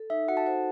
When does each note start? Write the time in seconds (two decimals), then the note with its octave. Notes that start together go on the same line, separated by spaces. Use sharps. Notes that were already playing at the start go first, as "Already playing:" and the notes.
Already playing: A4
0.10 D#4 E5
0.28 F#4 F#5
0.37 A5
0.46 C5 F#5